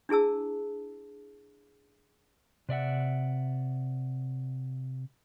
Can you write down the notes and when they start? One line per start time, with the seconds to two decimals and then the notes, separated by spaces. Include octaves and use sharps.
0.09 D4 E4 G#4 A5 E6
2.69 C3 D5 E5 F#5